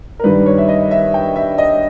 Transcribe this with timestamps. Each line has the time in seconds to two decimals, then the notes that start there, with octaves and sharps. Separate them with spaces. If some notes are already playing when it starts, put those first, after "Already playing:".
0.19 A#4
0.24 G2 D#3 G3 B4
0.46 C#5
0.58 E5
0.69 D#5
0.91 E5
1.14 G5
1.36 E5
1.58 D#5